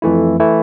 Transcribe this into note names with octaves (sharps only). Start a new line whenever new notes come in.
F2 E3 A3 E4
E3 A3 E4